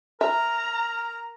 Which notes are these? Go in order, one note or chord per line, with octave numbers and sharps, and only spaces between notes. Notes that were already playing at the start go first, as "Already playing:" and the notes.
A#4 E5 A#5